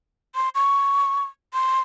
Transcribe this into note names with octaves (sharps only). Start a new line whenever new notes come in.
C6
C#6
C6